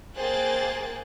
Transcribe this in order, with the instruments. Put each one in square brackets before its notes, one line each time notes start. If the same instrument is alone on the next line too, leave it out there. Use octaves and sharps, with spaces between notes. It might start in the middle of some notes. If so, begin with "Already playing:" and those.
[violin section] A#3 G#4 C5 G5 F#6 A6